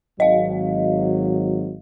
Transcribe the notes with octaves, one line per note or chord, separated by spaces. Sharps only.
G#1 F#3 D#5 F5